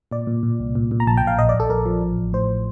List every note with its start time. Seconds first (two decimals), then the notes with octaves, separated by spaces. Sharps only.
0.11 A#2 D5
0.27 A#2
0.43 A#2
0.60 C2
0.75 A#2
0.91 A#2
1.00 A#5
1.07 A#1 A5
1.17 G5
1.22 A#1
1.27 F5
1.38 A#1 D#5
1.49 D5
1.54 A#1
1.60 A4
1.70 A#1 A#4
1.86 F3
2.02 A1
2.17 A1
2.33 A2 C5